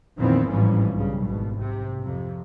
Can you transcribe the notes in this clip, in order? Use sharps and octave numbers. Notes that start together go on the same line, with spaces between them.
F2 A#2 D#3 E3 B3 C4
A1 G#2 E3 F3 G3 C#4
B1 G2 C#3
G#1 B2
C3
F2 C3